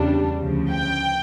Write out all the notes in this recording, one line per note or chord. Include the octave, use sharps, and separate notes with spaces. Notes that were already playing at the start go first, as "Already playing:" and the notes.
Already playing: E2 C#3 G3 D4
D2 C#3 F3
G5